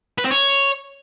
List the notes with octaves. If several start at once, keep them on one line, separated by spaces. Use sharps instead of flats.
B4
C4
C#5